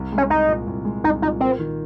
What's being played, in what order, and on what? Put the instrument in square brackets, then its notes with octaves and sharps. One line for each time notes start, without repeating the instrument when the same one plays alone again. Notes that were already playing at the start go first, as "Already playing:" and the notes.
Already playing: [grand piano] C2
G#3
[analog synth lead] C#4
[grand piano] C2 [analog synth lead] D#4
[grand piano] A#2
C2
G#3
[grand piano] C2 [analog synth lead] D#4
[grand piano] A#2 [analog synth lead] D#4
[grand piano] A#3 [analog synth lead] C4
[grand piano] D#3